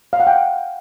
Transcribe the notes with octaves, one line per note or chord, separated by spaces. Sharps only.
F5
F#5
G5